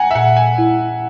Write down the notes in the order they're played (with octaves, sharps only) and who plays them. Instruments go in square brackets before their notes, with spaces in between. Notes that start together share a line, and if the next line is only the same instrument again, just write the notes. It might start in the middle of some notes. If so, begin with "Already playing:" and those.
Already playing: [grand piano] F#5 G#5 A#5
E5
[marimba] A#2 [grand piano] F#5
[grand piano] G#5
[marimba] E4